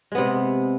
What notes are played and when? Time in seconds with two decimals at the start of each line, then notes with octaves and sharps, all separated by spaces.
0.12 G#3
0.15 B3
0.18 C3